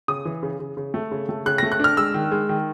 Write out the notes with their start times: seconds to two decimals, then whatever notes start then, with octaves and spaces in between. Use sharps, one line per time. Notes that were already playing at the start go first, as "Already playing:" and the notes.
0.08 C#3 D#6
0.25 E3
0.43 C#3
0.60 C#3
0.77 C#3
0.94 A3
1.11 C#3
1.29 A3
1.46 C#3 F#6
1.58 A3 A#6
1.72 F#6
1.80 D4 F6
1.97 G#3 E6
2.14 D#3
2.31 G#3
2.49 D#3